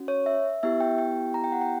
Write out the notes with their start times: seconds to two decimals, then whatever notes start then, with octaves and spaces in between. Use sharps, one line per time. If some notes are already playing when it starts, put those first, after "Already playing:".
Already playing: C#4 F#4
0.08 C#5
0.26 E5
0.63 B3 E4 G4 E5
0.80 G5
0.98 G5
1.34 A#5
1.44 G5
1.52 F#5
1.61 G5